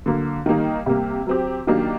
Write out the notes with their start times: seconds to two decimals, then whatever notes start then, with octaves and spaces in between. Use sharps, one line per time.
0.06 D3 F#3 A#3
0.46 D#3 G3 A#3 D#4
0.86 C3 G3 A#3
1.27 F#3 C4 G4
1.67 D#3 F#3 A#3 D4 G4